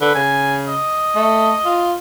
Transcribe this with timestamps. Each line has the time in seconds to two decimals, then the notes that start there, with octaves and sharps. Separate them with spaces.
0.01 D3 B4
0.15 C#3 G#5
0.68 D#5
1.16 A3
1.65 F4